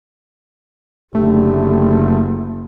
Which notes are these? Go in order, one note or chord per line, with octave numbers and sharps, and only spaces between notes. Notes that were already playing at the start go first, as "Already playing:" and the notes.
F#1 D3 A3 G4